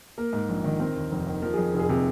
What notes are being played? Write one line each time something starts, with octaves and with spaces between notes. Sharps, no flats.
A#3 A#4
G#2
A#1
D#3
C4 A#4
D#2
F1
D#3
F3 A#4
F2 G#4
F1
G#4
C3